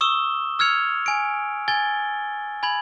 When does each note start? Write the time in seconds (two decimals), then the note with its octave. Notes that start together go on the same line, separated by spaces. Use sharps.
0.01 C#6 D#6 E6 E7 G7
0.59 E6 F6 G#6 C#7 F7
1.06 G#5 D7
1.68 G#5 G#6 A6 G7
2.63 G#5 B5 G#6 F#7